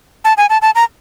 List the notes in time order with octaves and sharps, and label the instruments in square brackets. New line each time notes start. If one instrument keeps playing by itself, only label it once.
[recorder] A5
G#5
A5
A5
A#5